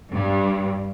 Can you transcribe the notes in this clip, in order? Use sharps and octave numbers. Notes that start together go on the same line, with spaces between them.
G2